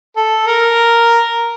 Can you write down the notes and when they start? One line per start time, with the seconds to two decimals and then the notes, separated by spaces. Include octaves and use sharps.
0.16 A4
0.47 A#4